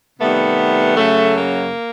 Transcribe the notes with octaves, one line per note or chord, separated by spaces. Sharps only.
C3 D#3 G3 A3 B3
F#2 C#3 F#3 A3
A#3